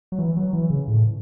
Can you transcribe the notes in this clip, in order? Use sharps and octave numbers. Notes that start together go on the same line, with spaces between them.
F#3
E3
F#3
E3
C#3
A2